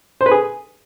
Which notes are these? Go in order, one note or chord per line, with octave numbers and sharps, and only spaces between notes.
C5
B4
G#4